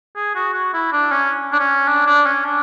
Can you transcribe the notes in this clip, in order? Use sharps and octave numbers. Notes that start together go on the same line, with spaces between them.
G#4
F#4
F#4
E4
D4
C#4
D4
C#4
D4
D4
C#4
D4